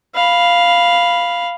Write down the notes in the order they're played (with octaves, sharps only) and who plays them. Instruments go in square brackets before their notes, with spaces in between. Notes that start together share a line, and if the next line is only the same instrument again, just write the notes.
[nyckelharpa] F5 B5